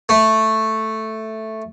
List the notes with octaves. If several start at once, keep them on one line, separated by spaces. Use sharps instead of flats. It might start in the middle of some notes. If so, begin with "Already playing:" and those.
A3